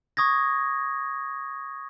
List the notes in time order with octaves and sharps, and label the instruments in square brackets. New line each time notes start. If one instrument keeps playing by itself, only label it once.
[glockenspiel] C#6 D#6 G#6 A#6